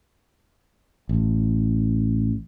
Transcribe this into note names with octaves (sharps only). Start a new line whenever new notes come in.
A1